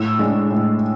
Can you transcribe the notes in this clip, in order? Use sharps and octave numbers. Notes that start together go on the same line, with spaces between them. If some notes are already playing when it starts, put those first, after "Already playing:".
Already playing: A2 E6
G#3 D4
A2